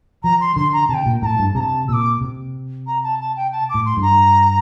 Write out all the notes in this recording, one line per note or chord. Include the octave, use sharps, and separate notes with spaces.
F3 A#5
C6
D3 C6
A#5
C3 A5
G5
A#2
A2 A5 A#5
G2
C3 A5 A#5
A#2 D6 E6
C3
A#5
A5
A5
G5
A5
D6
A2
C6
G2 A#5